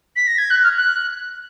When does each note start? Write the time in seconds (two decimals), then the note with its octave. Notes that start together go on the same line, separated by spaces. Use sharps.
0.16 B6
0.27 A#6
0.38 G#6
0.50 F#6
0.63 F6
0.77 F#6